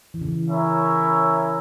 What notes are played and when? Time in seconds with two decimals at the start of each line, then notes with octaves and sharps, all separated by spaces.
0.14 E3
0.21 C#3
0.29 E3
0.49 C#4 E4 A#4 C#5 E5